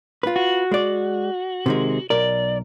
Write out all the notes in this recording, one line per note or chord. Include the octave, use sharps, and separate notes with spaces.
F4 B4
F#4
G#3 D5
C3 D#3 G#3
B1 A#4 D5